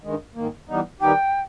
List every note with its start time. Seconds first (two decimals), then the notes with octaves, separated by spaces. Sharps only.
0.03 G2 D#3 G#3
0.35 G#2 D#3 A#3
0.68 E3 G3 B3 D#4
1.00 D#3 G3 B3 D#4 G4 G5